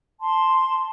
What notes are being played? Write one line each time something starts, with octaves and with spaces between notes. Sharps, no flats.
A5 C6